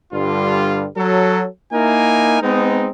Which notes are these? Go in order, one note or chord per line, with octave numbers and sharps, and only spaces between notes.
G2 D3 G3 F4
F#3 A4
A#3 D#4 E4 A#4 G#5
G#3 B3 C4 D#4